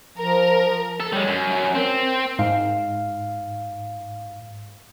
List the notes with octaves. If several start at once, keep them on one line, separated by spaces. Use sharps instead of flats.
F3 A#4
A4
G3 G#3 C#5
F#2
C4 A#4
G#2 F5